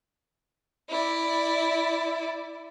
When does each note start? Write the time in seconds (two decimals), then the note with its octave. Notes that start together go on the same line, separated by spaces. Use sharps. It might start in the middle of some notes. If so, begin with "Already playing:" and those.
0.89 E4 D5